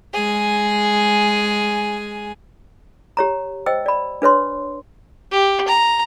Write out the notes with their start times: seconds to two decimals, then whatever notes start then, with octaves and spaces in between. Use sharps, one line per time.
0.13 G#3 G#4 G#5
3.17 G4 C#5 A#5
3.66 C5 D#5 G5 E6
3.86 D5 B5
4.22 D4 B4 C#5 C6
5.32 G4
5.68 A#5